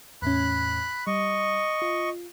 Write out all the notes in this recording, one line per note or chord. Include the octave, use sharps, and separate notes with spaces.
E2 A2 C#4 B5 F#6
G3 D#5 C#6
F4